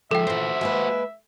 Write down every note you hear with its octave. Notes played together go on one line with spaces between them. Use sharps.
F3 G#3 A4 E5 G5
A#2 E3 F#4 C5
G#3 A#3 B4